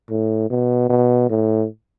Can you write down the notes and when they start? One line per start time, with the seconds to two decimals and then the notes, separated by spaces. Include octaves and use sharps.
0.10 A2
0.50 B2
0.89 B2
1.30 A2